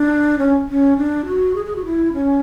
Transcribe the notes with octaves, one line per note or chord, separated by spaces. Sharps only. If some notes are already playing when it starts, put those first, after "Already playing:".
Already playing: D4
C#4
C#4
D4
F#4
G#4
G#4
F#4
E4
C#4